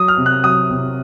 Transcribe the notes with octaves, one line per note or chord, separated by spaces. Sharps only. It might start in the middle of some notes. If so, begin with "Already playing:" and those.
Already playing: F#3 D#6
F6
C3
F#6
F#3 D#6
C3